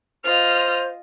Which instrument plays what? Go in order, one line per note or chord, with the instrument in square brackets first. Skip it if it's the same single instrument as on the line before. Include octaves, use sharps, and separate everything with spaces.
[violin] F4 D#5 [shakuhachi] C5 [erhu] F6